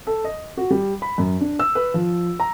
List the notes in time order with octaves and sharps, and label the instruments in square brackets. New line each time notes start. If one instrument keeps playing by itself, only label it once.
[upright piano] A4
D#5
F#4
G3
B5
F#2
D4
E6
B4
F3
A#5